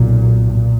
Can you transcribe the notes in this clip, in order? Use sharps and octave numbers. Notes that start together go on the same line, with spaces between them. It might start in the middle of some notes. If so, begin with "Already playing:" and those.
Already playing: B1 A#2
A#2